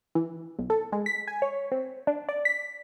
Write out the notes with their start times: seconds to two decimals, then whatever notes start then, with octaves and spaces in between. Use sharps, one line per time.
0.15 E3
0.59 B1
0.70 A4
0.92 G#3
1.06 B6
1.28 G#5
1.42 C#5
1.72 C4
2.07 D4
2.29 D5
2.45 B6